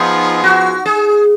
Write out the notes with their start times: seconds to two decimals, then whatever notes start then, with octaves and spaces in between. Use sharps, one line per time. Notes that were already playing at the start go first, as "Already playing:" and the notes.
Already playing: F3 B3 D#4 F4 G#4
0.44 F#4
0.86 G#4